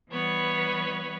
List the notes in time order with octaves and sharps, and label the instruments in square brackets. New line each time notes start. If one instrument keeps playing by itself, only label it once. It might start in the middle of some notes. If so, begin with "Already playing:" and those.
[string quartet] E3 G3 B3 B4 C#5